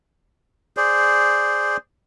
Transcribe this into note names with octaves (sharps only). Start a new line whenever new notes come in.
G#4 C5 D5